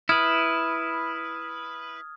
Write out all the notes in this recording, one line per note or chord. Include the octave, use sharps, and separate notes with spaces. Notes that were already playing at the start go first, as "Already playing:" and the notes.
E4 B4 D#6 F6 G#6